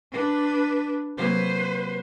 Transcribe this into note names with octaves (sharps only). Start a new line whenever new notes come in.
D4 B4
C3 F#3 A#3 B4 C5